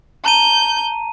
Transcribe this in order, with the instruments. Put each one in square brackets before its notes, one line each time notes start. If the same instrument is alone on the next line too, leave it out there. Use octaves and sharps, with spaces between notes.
[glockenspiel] A5 A#5 D#7 [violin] G6